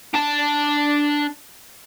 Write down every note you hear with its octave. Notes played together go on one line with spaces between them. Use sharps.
D4 A5